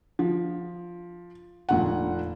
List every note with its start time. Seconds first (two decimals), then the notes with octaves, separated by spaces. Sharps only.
0.19 F3
1.69 F1 A#2 F#5